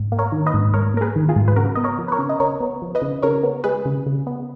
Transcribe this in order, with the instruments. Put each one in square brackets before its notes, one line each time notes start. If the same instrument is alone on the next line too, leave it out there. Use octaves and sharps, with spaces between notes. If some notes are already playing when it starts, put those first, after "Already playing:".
Already playing: [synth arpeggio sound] G#2
A#3
A#4 C#5
D#3
B4 D#5
G#2
G#2 A#4 C#5
A#3 A#4
G#4 B4
D#3
F4 G#4
G#2
B4
C#3 F#4 A#4
B3 D#5
A#4 C#5
F3
B4
A#4 C#5
C#3
D#5
C#3 A#4 C#5
B3
F3
B4 D#5
C#3
C#3 A#4 C#5
B3
G#3 G#4 B4
C#3
C#3
B3